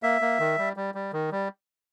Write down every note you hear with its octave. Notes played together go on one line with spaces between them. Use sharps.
A#3 E5
A#3
D#3
G3
G3
G3
D#3
G3